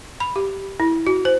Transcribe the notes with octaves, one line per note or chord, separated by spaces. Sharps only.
B5
G4
E4
F#4
C5